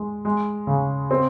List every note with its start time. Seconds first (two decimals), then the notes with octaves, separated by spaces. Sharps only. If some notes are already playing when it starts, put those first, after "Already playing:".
Already playing: G#3
0.25 G#3
0.67 C#3
1.11 C4